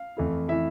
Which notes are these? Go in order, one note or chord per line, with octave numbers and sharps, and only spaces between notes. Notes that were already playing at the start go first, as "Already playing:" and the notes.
Already playing: F5
F2 E3 A3 E4
E3 A3 E4 E5